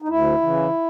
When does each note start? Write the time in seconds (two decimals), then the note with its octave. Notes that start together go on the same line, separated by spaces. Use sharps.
0.02 D#4
0.08 D2 E4
0.41 C#3 E3